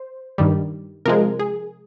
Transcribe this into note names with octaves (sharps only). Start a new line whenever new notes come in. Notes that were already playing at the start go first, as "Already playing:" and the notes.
Already playing: C5
G2 D#3 G3
C3 F3 G#3 A#4
G#4